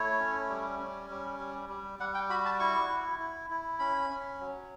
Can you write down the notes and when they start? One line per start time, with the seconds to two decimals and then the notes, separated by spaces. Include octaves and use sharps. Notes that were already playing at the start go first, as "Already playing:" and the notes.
Already playing: A3 E4 C#5
0.20 C#4
0.50 G3
0.79 C#4
1.10 G3
1.39 G3
1.69 G3
1.99 G3 F#5
2.14 G5
2.30 F#4 B5
2.45 A5
2.60 E4 C#6
2.89 E4
3.19 E4
3.50 E4
3.79 C#4 B5
4.10 C#4
4.40 F#3